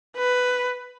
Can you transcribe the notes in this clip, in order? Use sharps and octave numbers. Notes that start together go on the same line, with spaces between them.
B4